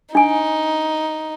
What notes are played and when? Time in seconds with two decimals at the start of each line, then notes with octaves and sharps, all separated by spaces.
0.15 D4 D#4 G#5